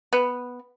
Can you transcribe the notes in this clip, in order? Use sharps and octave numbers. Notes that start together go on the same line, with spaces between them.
B3